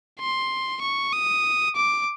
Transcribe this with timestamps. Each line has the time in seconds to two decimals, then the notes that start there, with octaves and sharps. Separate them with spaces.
0.20 C6
0.82 C#6
1.13 D#6
1.76 D6